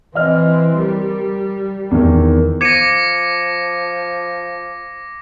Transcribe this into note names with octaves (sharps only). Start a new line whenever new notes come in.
E3 C4 D#5 F6
G3 A#4
E2 D#3
F3 D6 G#6 A#6 C#7 D#7